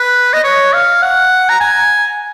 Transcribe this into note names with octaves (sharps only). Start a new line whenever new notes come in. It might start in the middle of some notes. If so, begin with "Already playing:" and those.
Already playing: B4
D#5
C#5
F5
F#5
A#5
G#5